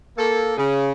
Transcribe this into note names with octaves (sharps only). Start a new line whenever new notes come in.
A#3 A4
C#3